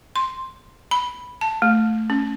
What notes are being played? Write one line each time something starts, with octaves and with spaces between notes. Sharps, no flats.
C6
B5
A5
A3
C#4